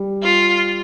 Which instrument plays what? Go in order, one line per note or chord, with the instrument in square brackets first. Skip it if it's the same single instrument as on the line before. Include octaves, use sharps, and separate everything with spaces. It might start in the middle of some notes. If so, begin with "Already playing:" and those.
Already playing: [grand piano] G3
[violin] F4